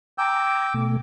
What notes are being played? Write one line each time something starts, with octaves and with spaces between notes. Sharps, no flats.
G5 G#5 A#5 D6 E6
B2 A3